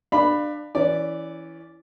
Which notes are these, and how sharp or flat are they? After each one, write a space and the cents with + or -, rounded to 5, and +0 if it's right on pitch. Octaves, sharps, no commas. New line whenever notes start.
D4 +25 F5 -5 B5 +0
E3 +0 C#4 +20 D5 -5